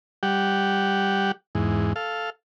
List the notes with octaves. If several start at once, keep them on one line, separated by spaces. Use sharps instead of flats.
G3 G4 F#5
E2 G#2
A4 F5